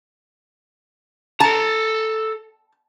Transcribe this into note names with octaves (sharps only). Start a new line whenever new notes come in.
A4 A5 A#5